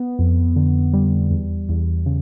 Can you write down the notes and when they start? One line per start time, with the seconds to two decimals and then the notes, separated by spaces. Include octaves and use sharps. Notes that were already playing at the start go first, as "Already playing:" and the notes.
Already playing: B3
0.19 F2
0.56 D3
0.93 G3
1.31 E2
1.69 E2
2.06 C#3